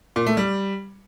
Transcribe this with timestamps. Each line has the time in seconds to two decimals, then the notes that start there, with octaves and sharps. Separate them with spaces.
0.16 A#2
0.27 A3
0.37 G3